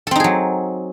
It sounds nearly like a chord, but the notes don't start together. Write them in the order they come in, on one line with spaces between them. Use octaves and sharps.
A4 C4 D#4 G#4 F#3